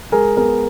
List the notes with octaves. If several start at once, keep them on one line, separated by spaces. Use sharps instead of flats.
G#3 G#4 A#4
B3 G#4 A#4